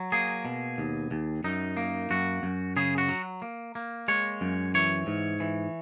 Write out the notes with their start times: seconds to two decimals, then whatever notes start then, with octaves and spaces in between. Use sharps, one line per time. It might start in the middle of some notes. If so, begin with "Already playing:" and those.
Already playing: F#3
0.12 A#3 G#4
0.45 B2
0.78 D#2
1.11 D#2
1.44 F#2 D#4
1.77 A#3
2.10 F#2 F#4
2.43 F#2
2.76 C#3 G#4
2.98 F#4
3.09 F#3
3.42 A#3
3.75 A#3
4.08 G#3 C#5
4.41 F#2
4.74 E3 C#5
5.07 G#2
5.40 E3